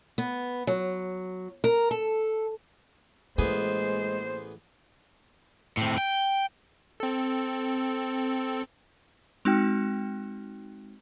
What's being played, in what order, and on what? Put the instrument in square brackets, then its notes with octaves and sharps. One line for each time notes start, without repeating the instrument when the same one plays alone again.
[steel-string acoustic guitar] B3
F#3
A#4
A4
[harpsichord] A1 B3 G#4 [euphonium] G#3 [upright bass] A#3 [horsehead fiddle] C5
[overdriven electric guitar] A2 C4
G5
[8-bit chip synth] C4 A4
[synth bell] G#3 C4 D#4 F#4 G5 F6